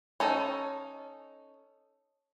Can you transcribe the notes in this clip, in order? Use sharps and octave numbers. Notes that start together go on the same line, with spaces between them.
C#4 D#4 A4 D#5 A5 B5